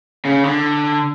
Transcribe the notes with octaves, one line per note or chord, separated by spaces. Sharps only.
C#3
D3